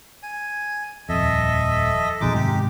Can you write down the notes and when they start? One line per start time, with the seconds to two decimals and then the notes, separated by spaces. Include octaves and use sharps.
0.23 G#5
1.09 D#1 F2 A4 D#5 E5
2.21 F2 B2 F3 G#3 D#4 D6
2.34 G#2 C3 D#3 G4